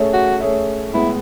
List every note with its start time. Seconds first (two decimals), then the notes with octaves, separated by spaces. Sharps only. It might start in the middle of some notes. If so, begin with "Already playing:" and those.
Already playing: A3 C#4 G#4 C#5 E5
0.13 F#4
0.40 A3 C#4 G#4 C#5 E5
0.93 A2 G#3 B3 E4